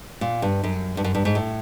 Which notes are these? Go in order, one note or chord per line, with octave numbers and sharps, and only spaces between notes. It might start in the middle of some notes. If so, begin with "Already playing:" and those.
A#2
G2
F#2
G2
F#2
G2
G#2
A2